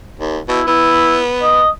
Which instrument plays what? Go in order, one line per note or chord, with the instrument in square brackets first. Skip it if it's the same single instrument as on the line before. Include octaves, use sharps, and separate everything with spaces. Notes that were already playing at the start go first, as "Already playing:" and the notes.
[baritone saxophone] D#2
[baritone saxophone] B2 [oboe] E4
[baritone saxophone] B3 [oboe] E4
[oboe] D#5